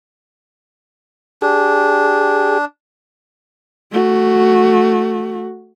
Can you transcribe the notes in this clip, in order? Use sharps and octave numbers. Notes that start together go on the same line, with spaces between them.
D4 G4 G#4
A3 F#4